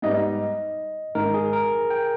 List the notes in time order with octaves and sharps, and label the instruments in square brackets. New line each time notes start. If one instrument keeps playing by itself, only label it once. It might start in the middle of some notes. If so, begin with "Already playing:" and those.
[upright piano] G#2 G3 B3 D#4 [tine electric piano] D#5
[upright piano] G#2 D#3 G#3 [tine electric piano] A#4
[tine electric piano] G#4
A#4
G5